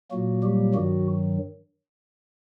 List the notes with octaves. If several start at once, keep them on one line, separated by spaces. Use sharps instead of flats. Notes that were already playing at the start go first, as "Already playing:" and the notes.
A#2 F#3 A#3 F#4
G3 G4
G2 D#3 F#3 F#4